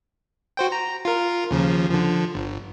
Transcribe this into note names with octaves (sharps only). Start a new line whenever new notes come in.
F#4 C5 G5
A#5
F4 A#4
D#2 C#3 F3
D3 F3
G1